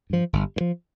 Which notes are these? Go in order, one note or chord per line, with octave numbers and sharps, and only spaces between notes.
G2 F3
G1
G2
F3